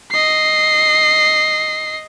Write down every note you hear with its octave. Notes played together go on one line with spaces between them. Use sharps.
D#5 C7